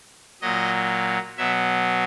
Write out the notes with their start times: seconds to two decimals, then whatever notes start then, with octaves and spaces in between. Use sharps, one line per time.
0.41 A#2 F#3 D#5
1.37 B2 F#3 E5